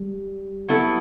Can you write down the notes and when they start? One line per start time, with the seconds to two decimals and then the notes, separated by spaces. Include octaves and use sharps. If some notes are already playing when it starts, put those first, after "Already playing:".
Already playing: G3
0.68 F#3 B3 E4 A4